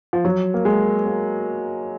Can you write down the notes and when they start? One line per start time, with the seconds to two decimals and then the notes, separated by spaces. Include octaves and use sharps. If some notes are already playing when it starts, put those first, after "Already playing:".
0.13 F3
0.25 F#3
0.54 A#3
0.65 G#3
1.06 A#3